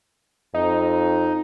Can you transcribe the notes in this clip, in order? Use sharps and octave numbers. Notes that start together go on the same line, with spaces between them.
F2 D#4